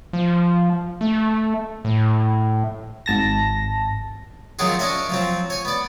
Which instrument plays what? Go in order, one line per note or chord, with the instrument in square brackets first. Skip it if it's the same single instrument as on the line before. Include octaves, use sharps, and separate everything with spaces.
[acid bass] F3
A3
A2
[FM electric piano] G#1 A5 A#6
[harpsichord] D#3 F3 F#3 C4 F#4 G#4
C#4 D4 C#5 D#5 E5
F3 F#3 C4
C#5 G#5
B3 D5